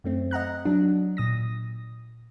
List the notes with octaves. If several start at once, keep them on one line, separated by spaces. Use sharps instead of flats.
F#2 A3 C4
D#5 F#5 A#5 F#6
F#3 D4
A#2 D#6 A#6